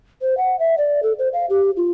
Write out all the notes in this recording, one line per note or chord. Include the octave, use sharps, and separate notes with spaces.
C5
F#5
E5
D5
A4
C5
F5
G4
F4